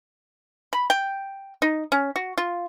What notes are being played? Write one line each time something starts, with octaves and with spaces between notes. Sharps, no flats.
B5
G5
D#4
C#4
F#4
F4